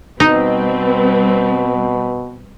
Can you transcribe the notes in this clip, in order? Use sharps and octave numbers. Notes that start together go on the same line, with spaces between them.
B2 G3 C4 D#4 B4